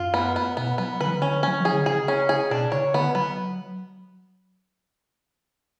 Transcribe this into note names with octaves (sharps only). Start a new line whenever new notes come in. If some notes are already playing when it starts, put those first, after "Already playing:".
Already playing: F#2 F4
B3
B3
B2 B3
F#3 B3
D3 B4
F3
D3
C#4
F#3 C#4
F3 G#4
D3
C#3 G#4
C#4
G#4
B2 D4
C#3 C#5
D3 B3
F#3 B3